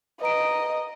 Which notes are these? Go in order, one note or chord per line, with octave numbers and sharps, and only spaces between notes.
B4 D#5 A#5 D7